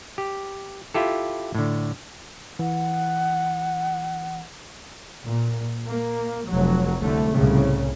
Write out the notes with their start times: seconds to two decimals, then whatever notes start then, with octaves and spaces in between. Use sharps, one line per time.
0.18 G4
0.94 E4 F4 G4 A4
1.55 A2 D3
2.59 E3 F#5
5.26 A#2
5.86 A#3
6.49 F1 F#3
7.02 C2 D3 A3
7.34 C2 A2 C#3